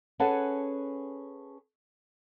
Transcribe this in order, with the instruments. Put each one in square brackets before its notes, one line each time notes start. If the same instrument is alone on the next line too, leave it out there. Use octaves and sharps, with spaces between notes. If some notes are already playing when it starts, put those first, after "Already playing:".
[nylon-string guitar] C#4 G#4 A4 B4 F#5 A5